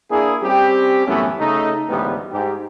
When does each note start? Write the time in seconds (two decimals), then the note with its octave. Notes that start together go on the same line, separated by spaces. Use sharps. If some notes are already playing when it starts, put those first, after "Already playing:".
0.11 A#3 D4 E4 G#4
0.43 G3 C4 C#4 G4
1.07 F#2 A2 E3 A3 B3 C#4
1.40 C#3 A3 D#4
1.89 A1 D2 G3 G#3 B3
2.32 G#2 G4